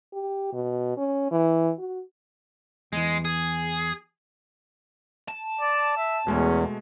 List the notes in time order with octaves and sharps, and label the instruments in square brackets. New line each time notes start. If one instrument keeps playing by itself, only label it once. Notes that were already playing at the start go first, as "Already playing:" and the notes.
[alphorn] G4
B2
C#4
E3
F#4
[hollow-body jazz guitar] E2 E3 [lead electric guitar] G#3
[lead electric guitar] G#4
[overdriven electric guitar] A5
[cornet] D5
E5
[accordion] E2 [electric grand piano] B2 G#3 A3 [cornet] C#4